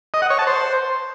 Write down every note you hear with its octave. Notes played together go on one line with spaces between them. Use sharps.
D#5
F#5
C#5
A5
C5